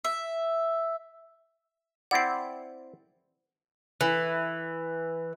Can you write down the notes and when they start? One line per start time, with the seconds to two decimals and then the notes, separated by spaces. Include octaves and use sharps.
0.04 E5
2.11 C4 E4 D5 F#5 C7
4.01 E3